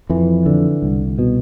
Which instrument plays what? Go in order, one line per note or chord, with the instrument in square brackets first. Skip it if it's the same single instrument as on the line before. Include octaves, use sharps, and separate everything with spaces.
[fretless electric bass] F2 E3
D3
C2
B2